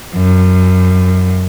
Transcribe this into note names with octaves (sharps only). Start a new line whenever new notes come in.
F#2